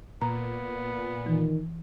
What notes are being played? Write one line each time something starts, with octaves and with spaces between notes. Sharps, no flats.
A#2 B3 A#5
D#3 E3